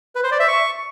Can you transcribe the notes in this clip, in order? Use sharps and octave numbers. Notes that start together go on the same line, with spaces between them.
B4
C5
D5
E5
C#6